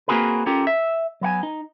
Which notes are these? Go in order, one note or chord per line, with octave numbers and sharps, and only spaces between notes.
A#3 C4 F#4 G#4 A#4 B4
C#4 F4 G4 A4 A#4
E5
F#3 B3 F#5 G#5
D#4